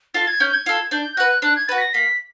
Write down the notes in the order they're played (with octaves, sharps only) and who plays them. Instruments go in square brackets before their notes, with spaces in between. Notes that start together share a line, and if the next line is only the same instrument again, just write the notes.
[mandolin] F4 A4 [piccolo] A6
[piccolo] G#6
[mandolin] C#4 [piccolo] G6
[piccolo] G#6
[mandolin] F4 A4
[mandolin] D4 [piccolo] G6
[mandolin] F#4 B4 [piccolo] F#6
[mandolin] D4 [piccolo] F#6
[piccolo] G#6
[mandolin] F#4 B4 [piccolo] A6
[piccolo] B6
A#6
[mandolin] A#3 [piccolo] B6